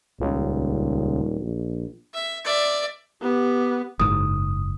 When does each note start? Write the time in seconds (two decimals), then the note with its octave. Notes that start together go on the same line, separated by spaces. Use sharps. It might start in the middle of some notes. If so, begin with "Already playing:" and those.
0.20 D#1 C#2
1.41 A#1
2.14 E5
2.45 D5 E5
3.22 B3 G4
4.00 F#1 G#2 D#6